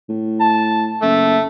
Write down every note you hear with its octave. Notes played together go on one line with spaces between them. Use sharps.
A2
A5
F#1 A3